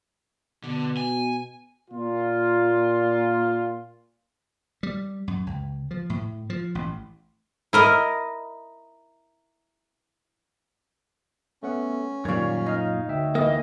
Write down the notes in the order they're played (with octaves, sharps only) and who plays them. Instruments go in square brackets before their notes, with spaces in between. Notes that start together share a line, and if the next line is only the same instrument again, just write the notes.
[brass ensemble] B2 [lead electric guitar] D3
[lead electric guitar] G#5
[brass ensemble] A#2 F4
[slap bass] G3
F#2
C#2
F3
A2
F3
A1
[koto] E4 A#4 D#5
[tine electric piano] A3 B3 F#5 [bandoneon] C#4
[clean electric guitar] F#2 A#2 [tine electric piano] D#3 G3 [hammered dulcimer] C#5 F5
[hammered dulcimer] D#4 [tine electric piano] D#5 F5 F6
[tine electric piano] D2 E5 G5
[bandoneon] E3 [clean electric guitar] A#3 [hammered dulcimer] D#5